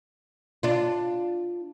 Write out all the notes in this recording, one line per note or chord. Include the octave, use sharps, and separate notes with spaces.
D4 F4